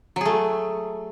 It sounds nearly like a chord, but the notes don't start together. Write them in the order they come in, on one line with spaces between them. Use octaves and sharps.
F#3 G#4 A3